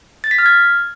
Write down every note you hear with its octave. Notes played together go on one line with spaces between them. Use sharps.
A6
B6
F6
G#6